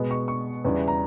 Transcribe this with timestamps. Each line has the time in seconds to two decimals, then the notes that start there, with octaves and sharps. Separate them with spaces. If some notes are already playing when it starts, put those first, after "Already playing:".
Already playing: B2 G#3 B3
0.11 C#6
0.28 C#6
0.65 E2 C#3 E3 G3
0.88 A#5